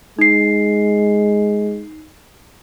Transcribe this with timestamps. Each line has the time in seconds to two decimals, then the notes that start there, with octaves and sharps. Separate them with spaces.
0.19 G#3 D#4 C7